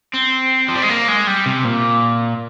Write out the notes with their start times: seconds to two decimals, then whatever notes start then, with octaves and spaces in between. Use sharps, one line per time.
0.14 C4
0.69 F3
0.75 G3
0.82 G#3
0.89 A#3
1.08 G#3
1.27 G3
1.46 C3
1.64 A#2